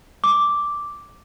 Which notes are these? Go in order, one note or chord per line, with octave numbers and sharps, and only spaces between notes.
D6